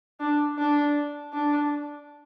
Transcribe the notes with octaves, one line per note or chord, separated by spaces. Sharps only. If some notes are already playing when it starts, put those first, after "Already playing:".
D4
D4
D4